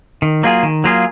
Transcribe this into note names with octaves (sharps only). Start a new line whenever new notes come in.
D#3
F#3 A#3 F4 G#4
D#3
F#3 A#3 F4 G#4